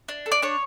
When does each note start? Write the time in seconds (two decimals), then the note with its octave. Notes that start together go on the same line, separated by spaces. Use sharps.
0.08 D4
0.26 A4
0.32 D5
0.42 D4 C#5